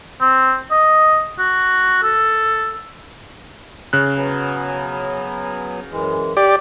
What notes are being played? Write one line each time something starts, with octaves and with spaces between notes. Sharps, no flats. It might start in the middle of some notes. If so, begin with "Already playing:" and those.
C4
D#5
F#4
A4
C#3 F#6
F#3 B3 G#5
F#2 E3 G#3
G4 D5